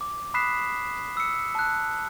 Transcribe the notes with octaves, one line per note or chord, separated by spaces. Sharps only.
D6
B5 D#6 F#6 B6 C7 E7
E6 C#7
A5 F#6